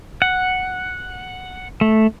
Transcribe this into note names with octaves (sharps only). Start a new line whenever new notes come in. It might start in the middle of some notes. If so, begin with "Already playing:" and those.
F#5
A3